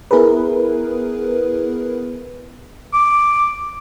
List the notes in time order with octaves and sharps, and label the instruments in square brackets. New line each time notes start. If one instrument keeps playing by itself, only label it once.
[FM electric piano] B3 E4 G#4 A#4 B4
[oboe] D6